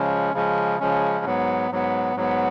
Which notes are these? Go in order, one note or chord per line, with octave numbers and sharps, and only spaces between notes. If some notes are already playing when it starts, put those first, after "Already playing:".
Already playing: C#3 F3 G#3 C#4
C#3 F3 G#3 C#4
C#3 F3 G#3 C#4
G#2 F#3 B3
G#2 F#3 B3
G#2 F#3 B3